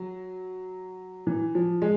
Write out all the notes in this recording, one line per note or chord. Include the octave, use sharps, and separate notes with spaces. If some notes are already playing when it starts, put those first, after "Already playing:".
Already playing: F#3
E3
F3
G#3